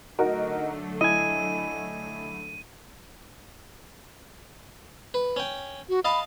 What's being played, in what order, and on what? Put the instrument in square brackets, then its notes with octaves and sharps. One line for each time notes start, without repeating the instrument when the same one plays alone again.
[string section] D3 F#3 A3 [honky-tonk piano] D#4 F#4 A#4
[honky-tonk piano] E4 [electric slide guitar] D#5 G#5 [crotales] D#7
[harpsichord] B4
C#4 G5
[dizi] F#4
[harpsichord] D#5 F5 A5 [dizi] B5